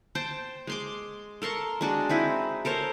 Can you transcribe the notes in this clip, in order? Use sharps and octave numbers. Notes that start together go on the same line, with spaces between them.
C5 G5 A5
G#3 C6 D6
A4 A#4 C6 C#6
G#3 D4 F#4
C4 D#4 E4
A4 A#4 C5 C#5